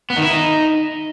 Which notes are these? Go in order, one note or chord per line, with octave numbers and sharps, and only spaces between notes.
B3
D#3
E4
D#4